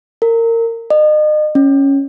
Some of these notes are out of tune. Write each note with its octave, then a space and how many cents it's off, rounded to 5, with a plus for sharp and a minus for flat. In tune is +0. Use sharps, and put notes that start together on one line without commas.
A#4 -25
D#5 -35
C#4 -5